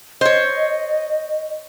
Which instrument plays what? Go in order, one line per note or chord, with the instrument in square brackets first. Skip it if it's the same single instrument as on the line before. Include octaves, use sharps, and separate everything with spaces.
[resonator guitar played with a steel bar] C5 C#5 [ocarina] D#5